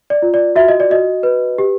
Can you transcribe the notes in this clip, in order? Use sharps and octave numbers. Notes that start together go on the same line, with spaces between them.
D5
F4
D5
F#4 E5
D#5
D5
F#4 D#5
B4
G4